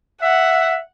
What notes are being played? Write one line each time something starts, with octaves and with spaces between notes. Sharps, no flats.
E5 F#5